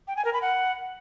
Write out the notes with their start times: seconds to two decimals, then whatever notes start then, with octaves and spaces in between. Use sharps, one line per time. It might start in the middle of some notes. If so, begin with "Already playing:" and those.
0.08 G5
0.16 G#5
0.25 A#4
0.33 B5
0.42 F#5